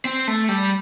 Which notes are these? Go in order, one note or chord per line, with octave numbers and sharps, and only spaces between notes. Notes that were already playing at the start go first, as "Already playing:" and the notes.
C4
A3
G3